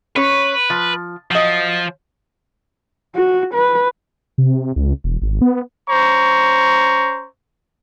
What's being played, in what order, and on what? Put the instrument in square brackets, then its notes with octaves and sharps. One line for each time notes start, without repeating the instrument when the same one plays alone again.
[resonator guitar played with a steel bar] C#4 C#5 [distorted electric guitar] B4
[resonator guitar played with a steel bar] F3
[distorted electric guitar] F3 [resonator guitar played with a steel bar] F#3 D#5
[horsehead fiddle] F#4
B4
[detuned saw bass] C3
C#2
E1
G#1
B3
[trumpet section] C#4 C5 A#5 C#6